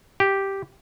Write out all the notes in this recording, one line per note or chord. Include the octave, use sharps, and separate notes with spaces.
G4